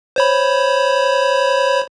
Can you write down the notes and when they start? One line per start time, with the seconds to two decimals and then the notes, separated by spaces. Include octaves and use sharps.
0.16 C5 C#5 B5